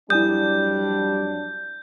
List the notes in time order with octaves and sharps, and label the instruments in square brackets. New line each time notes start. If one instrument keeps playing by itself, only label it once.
[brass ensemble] F2 F#3 D4 [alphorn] G3 [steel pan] E4 G#5 D#6 [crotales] G6